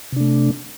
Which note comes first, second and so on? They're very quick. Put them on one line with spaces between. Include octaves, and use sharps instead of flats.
C3 D4 A3